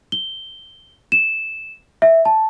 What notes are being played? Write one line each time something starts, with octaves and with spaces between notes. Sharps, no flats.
G7
E7
E5
A5